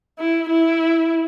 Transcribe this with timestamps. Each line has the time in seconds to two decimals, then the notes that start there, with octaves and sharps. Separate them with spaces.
0.19 E4
0.50 E4